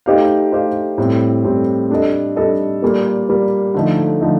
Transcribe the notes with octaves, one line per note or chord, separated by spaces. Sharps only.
A3 D#4 G4 C5 F5
A3 D#4 G4 C5 F5
A2 G3 C4
A2 G3 C4
G3 D4 A4 D#5
G3 D4 A4 D#5
A#2 G3 A#3
A#2 G3 A#3
D3 F3 A3 D#4
D3 F3 A3 D#4